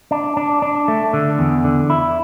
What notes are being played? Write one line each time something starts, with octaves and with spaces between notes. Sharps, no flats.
D4
D4
D4
A3
D3
E2
D3
E4